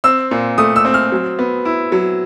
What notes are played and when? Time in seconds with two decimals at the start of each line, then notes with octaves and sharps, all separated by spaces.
0.04 C4 E6
0.31 A#2
0.58 A3 D#6
0.76 E6
0.85 C4
0.94 F6
1.12 F#3
1.39 B3
1.65 E4
1.92 F#3